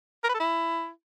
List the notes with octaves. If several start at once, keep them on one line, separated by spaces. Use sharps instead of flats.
A#4
B4
A4
E4